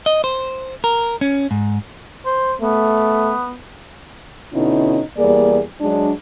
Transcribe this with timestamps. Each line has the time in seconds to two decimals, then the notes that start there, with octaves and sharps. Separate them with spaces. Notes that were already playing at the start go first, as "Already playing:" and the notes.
0.06 D#5
0.24 C5
0.84 A#4
1.21 C#4
1.51 G#2
2.26 C5
2.62 A3 B3
4.54 B2 D3 C#4 D#4 E4
5.18 E2 G3 A#3 G#4 D5
5.81 F#3 G#3 D4